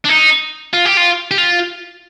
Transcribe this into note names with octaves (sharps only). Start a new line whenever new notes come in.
D4
D#4
F4
G4
F4
G4
F4